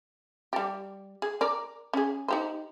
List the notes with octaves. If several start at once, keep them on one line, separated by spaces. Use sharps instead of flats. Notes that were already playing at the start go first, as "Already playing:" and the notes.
G3 G4
G#4
A#4 D5
C#4 G#4
D#4 G4 C5